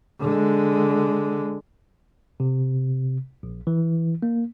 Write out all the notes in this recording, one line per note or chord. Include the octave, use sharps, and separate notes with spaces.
D3 G#3
C3
A#1
E3
A#3